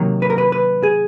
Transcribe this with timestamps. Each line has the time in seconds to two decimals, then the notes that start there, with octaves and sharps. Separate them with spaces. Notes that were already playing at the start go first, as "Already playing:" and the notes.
Already playing: C3 D#3 F#3 A#3
0.22 B4
0.30 A#4
0.38 B4
0.52 B4
0.83 G#4